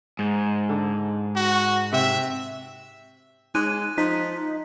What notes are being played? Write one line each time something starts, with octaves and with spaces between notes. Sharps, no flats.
G#2
D3
F#4
C3 E5
G#3 D#4 F#6 D#7
F3 D#4 B6